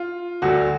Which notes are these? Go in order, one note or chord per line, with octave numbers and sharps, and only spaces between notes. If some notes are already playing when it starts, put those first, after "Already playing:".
Already playing: F4
D2 D3 F#3 F#4